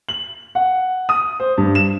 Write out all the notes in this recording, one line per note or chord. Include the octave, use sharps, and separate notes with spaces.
F#7
F#5
D#6
C5
G2
E7